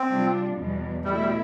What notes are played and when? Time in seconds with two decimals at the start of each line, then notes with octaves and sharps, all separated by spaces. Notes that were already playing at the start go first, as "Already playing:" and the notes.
Already playing: C4
0.09 C3 G3 D4 F4
0.56 E2 B2 G3 B3
1.05 B2 G3 A3 E4
1.21 G3